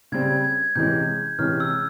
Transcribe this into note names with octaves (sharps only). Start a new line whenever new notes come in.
C#3 G3 C4 G#6
G#6
C3 E3 G#3 C#4 G6
C3 E3 G#3 C#4 F6
E6